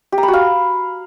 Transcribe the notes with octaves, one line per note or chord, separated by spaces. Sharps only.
G4
A#5
B5
F#4
F5